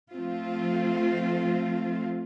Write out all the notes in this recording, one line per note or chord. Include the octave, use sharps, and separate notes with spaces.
F3 A3 C4 F4